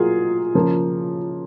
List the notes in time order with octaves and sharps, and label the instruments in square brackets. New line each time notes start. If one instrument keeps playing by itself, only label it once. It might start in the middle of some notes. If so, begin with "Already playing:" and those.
Already playing: [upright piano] F#3 A#3 F4 G#4
C#3 F3 A#3